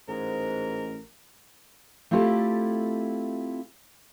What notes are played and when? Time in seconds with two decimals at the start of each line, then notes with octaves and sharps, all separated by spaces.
0.08 A1 G#2 A#4
2.11 A3 C4 E4 F4 G4 A4